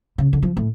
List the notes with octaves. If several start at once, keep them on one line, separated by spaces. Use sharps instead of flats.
C#3
D3
F3
A2